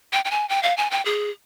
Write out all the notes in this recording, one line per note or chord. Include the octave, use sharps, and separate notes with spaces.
G5
G5
G#5
G5
F5
G#5
G5
G#4